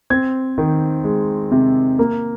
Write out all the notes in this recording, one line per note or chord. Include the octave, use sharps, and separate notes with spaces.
C4 G#6
D#3
G#3
C3
A#3